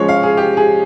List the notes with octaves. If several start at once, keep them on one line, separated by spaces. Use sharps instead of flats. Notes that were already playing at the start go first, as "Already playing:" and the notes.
Already playing: F3 G#3 C#4 C#5
F5
G#4
G4
G#4